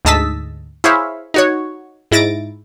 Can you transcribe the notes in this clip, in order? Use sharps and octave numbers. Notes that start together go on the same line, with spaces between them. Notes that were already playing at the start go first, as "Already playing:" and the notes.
D2 G#2 D#5 A5 E6 B6
E4 G#4 C5 C#5 E5 F5
D#4 F#4 C#5
G#2 E4 A6 A#6 D7